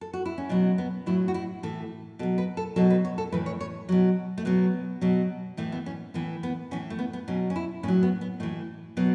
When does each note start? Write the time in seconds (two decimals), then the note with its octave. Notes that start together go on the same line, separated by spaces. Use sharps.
0.01 A4
0.13 F#4
0.26 E4
0.38 C#4
0.49 B2 F#3 B3
0.78 B3
1.06 A2 F#3 E4
1.28 F#4
1.34 E4
1.63 A2 E3 A4
2.19 B2 A4
2.23 F#3
2.38 B4
2.57 A4
2.76 B2 F#3 A4
2.90 B4
3.05 C#5
3.18 A4
3.32 A2 E3 B4
3.46 C#5
3.61 C#5
3.89 B2 F#3
4.38 A3
4.45 B2 F#3 B3
5.01 B2 F#3
5.57 A2 E3 A3
5.72 B3
5.86 C#4
6.14 A2 E3 B3
6.43 B3
6.71 A2 E3 C#4
6.90 A3
6.99 B3
7.13 B3
7.28 B2 F#3 C#4
7.50 C#4
7.56 E4
7.83 A2 C#4
7.88 F#3
8.03 B3
8.21 B3
8.40 A2 E3 A3
8.97 B2 F#3 B3